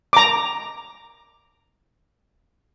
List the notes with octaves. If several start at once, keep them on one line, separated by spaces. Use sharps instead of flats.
A#5 D6